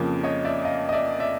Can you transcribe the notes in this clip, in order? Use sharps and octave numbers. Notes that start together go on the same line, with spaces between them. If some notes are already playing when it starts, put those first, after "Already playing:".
Already playing: F2 C#3 F3 A#3
C#5 D#5
D5 E5
D#5 F5
D#5
D5 E5
D5 E5